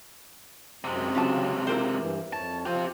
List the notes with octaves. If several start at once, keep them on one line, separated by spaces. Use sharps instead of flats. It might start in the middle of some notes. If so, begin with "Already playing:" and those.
F#2 C3 G#3 C4
C#3 F#3 C4 C#4 F4 A5
E4 F4 A#4 C5
G2 E3
F2 C#5 A5
F3 F4 G4 C5